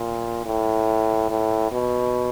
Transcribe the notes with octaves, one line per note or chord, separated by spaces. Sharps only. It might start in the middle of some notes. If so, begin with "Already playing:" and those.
Already playing: A#2
A2
A2
B2